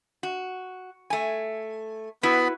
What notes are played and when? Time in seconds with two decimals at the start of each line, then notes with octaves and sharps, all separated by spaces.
0.23 F#4
1.10 A3 G#5
2.23 B3 E4 F#4 B4 B5